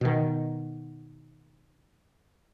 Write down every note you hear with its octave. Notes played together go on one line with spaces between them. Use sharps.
B2 D#3